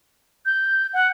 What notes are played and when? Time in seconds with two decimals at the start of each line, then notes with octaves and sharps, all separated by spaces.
0.46 G6
0.93 F#5